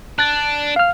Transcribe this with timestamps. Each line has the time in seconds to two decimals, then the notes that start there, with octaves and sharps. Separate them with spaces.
0.19 D4 F#6 A6
0.76 F5 F6